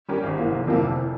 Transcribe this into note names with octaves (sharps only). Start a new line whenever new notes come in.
G3 C#4 G4 A#4
G#1
G#2 E3 A#3
F1
F2 C3 E3 A#3
F1
E3